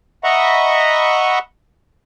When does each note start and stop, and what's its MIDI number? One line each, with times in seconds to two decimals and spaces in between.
0.24 1.39 75
0.24 1.39 76
0.24 1.39 78
0.24 1.39 82
0.24 1.39 83
0.24 1.39 85